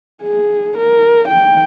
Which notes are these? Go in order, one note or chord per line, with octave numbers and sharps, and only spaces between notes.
G#4
A#4
G5